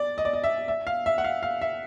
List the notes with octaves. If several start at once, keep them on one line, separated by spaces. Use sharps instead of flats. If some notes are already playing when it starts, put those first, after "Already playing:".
Already playing: D5
D#5
D5
D#5
E5
E5
F5
E5
F#5
F5
F5
E5